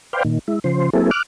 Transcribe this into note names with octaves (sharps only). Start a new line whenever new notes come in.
B4 C5 D5 F5 G5
A#2 D#3
G#3 E4
C#3 F3 C5
F#3 A#3 C4 E4 G#4 A4
D6 F6 F#6